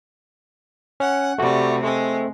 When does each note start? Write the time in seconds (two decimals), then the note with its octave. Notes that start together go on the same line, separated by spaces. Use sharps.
1.00 C#4 F#5
1.38 C3 G3 A3 F#4
1.83 G#3 A3 C4